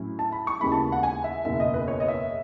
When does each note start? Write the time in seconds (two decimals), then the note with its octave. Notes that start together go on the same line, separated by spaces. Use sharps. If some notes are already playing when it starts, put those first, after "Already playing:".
Already playing: A2 F#3 C#4 E4
0.19 A5
0.32 B5
0.47 C#6
0.60 D#2 C#3 G#3 B3 E4 B5
0.72 A5
0.92 F#5
1.03 G#5
1.24 E5
1.45 F#1 E2 B2 E5
1.60 D#5
1.74 B4
1.88 C#5
2.00 D#5
2.08 E5